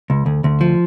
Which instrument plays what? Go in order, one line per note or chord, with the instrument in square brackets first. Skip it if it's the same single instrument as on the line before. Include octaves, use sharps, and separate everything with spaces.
[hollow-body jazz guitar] C#2
D2
D2
F3